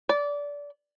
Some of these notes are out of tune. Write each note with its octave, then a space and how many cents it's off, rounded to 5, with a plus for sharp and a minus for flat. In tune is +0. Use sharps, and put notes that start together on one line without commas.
D5 -20